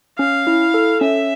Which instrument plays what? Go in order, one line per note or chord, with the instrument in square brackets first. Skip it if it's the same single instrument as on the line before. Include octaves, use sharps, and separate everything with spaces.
[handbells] C#4 [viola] F5
[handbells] E4
A4
[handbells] C#4 [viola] E5